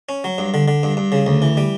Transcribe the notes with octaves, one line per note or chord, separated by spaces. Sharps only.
C#4
F#3
G2
D3
D3
G2
G2
C#3
D2
E3
G3